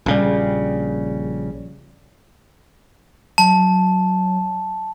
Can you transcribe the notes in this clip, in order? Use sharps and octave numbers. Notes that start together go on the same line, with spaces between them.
A#1 C#3 G3
F#3 A5